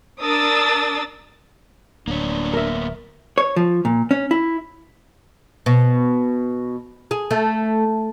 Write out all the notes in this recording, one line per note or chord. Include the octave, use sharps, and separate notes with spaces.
D4 A#4 D#6 E6 A6
D1 A#3 B3 D4 C#5
A#4 E5
C#5
F3
A#2
C#4
E4
B2
G#4
A3